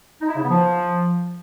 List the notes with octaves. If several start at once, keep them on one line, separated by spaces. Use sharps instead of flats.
D#4
E4
C#3
B3
F3